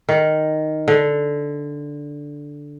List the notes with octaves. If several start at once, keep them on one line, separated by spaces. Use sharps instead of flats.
D#3
D3